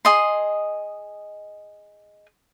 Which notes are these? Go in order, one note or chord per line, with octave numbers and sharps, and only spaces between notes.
G#4 D#5 C6